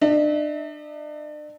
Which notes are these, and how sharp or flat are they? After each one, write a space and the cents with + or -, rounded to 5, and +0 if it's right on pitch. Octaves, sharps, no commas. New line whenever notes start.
D4 +35 E5 -35